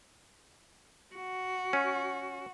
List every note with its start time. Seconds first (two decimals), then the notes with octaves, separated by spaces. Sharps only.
1.15 F#4
1.73 C#4